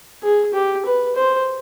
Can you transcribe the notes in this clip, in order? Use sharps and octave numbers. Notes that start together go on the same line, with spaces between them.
G#4
G4
B4
C5